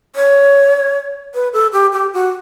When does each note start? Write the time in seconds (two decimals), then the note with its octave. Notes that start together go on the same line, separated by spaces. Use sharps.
0.16 C#5
1.34 B4
1.53 A4
1.73 G4
1.93 G4
2.13 F#4